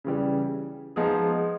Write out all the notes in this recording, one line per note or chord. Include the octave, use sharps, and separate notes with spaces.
C#3 E3 G3
F3 G#3 B3 D#4 G#4